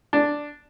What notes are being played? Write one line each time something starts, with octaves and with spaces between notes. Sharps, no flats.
D4